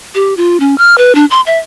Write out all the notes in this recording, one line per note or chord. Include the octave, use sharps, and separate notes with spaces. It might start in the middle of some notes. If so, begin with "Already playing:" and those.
G4
F4
C#4
F6
B4
D4
C6
E5